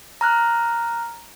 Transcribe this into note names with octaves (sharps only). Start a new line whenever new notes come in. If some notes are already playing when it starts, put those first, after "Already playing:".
A#5 F6 F#6